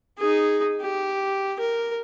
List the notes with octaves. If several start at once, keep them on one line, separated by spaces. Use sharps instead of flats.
D#4 G#4
G4
A#4